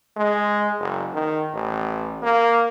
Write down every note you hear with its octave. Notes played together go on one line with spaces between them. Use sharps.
G#3
F#1
D#3
A1
A#3